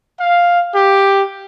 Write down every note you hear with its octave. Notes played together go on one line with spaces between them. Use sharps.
F5
G4